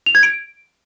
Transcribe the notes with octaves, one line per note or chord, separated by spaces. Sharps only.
F7
G#6
D7